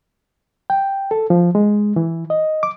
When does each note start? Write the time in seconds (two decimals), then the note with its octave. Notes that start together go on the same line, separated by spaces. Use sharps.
0.70 G5
1.11 A4
1.30 F3
1.55 G#3
1.96 E3
2.30 D#5
2.63 D6